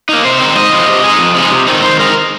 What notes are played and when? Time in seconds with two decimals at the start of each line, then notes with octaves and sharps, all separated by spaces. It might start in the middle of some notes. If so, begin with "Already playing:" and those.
0.09 A#3 D#4
0.25 C3 C5
0.40 D#3 C4 D#4
0.56 G#2 D#5
0.72 F3 C4
0.87 C3
1.04 G#3 D#4
1.19 F2
1.35 F3 G#3 D#4
1.50 C3
1.67 D#3 C4 D#4
1.82 D#3 C5
1.99 G#3 D#4 A#4